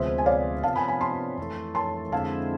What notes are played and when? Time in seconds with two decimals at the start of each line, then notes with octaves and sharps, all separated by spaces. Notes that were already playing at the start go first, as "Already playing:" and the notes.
Already playing: D2 C3 F3 G#3 B3 C5 E5
0.18 G#5
0.26 D5 F5
0.63 C3 F3 B3 F5 A5
0.76 G#5 B5
0.88 G#5 B5
1.00 A5 C6
1.38 F2 E3 A3
1.75 A5 C6
2.12 F2 D3 G#3 C4 E4 F5 A5